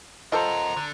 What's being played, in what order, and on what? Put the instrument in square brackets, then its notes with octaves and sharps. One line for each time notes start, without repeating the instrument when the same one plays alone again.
[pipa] F4 A4 C5 [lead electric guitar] A#4 F#5 [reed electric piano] D#5 [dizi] A#5
[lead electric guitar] D3